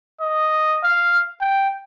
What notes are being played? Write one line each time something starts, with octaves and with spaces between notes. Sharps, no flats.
D#5
F5
G5